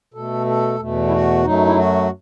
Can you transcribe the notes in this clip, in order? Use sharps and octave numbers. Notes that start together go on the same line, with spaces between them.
B2 A3 A4
A4
E2 B2 A3
E4
F#4
F#2 F#3 A3 D#4
E4
F#4